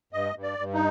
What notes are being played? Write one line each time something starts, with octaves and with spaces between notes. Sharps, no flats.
G2 D#5
G2
D5
G2
D#4